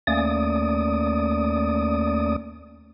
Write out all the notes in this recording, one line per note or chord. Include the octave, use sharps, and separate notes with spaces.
D#2 A3 A#3 C#4 D5 D#6